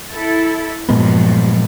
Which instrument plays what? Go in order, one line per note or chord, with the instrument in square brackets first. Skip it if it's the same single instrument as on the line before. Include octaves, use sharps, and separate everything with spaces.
[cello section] E4 A4
[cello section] G2 F3 F#3 [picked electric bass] A#2 G#3 B3